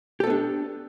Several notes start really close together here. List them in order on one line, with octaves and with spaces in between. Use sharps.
G4 A4 B3 D4